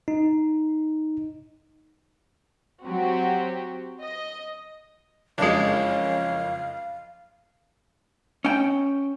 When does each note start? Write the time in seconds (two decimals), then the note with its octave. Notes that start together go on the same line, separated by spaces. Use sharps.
0.08 D#4
2.85 F#3 C4 F#4 G4
4.00 D#5
5.38 F#1 F2 G#3 C#4 D4 F5
8.45 C#4 G5